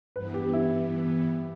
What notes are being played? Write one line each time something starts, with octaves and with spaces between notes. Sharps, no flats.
G2 E3 B3 B4
G4
E4